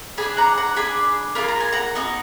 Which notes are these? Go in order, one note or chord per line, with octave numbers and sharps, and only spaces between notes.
D4 G#4 G#5 B5
F#5 A#5
F#5 A#5
D4 G#4 G#5 B5
A#3 F4 G#4 B5
A#5
G#5
F#5 A#5
B3 D#4 F#4